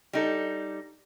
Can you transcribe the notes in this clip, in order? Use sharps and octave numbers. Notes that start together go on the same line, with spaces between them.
G3 D#4 A4